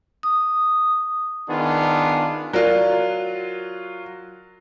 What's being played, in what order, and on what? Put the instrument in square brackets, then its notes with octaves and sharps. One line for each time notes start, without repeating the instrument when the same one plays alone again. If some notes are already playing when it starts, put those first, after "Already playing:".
[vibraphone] D#6
[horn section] D#3 B3 D4 F4 G#4
[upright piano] F#3 F4 [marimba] A#4 D5